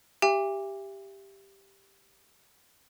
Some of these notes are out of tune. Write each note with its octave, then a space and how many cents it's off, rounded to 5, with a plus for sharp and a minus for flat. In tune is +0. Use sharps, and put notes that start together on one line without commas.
G4 +0 E5 +30 G#5 -45